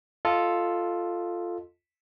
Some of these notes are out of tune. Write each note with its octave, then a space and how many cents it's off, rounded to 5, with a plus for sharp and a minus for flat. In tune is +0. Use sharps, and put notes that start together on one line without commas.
F4 +0 A4 +0 D#5 +0